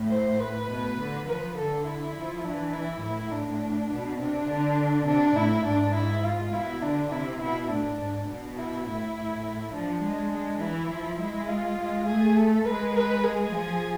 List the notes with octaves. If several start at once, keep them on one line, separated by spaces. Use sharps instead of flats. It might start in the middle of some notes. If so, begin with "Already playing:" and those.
Already playing: A2
C5
B4
B2
D3
F3 B4
D3 A4
E4
F3
E3 D4
E4
A2 E4
D4
B2
C3 D4
D3
C3 D4
A2 E4
G#2 D4
E4
F4
B2 E4
D3 D4
C3 E4
B2 E4
A2 D4
G#2
B2
E4
A2 E4
A2
F3 D4
G#3
G#3
E3 E4
F3
G#3 E4
F4
G#3
A3 G#4
A4
G#3 B4
B4
G#4
F3